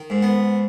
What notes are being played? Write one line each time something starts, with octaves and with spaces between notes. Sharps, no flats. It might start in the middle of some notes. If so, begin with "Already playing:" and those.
Already playing: D#3
G#2
B3